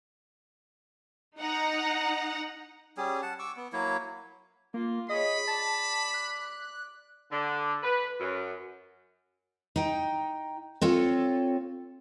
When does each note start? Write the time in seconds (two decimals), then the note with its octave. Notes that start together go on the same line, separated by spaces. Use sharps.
1.38 D#4 F#5 A#5
2.97 G3 C#4 G#4
3.22 F#5 A5
3.39 C#6 D6 E6
3.57 B3
3.73 F#3 A#3 E4 C#5
4.74 A#3 F4
5.09 G#4 C#5 D#5 B5
5.47 D5 A5
6.14 F#6
7.31 D3
7.83 B4
8.20 F#2
9.76 D#4 G5
10.81 C4 F4 A4 C#5